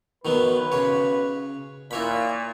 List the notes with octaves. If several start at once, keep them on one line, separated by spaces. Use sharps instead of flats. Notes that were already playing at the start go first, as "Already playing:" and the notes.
B1 D#3 F#3 B3 B4
C#3 C#5
A#2 E4 C#5 B5